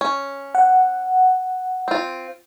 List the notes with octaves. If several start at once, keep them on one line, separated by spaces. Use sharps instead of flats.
C#4
F#5
C4 F4